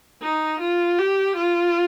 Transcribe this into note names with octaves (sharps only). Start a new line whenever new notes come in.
D#4
F4
G4
F4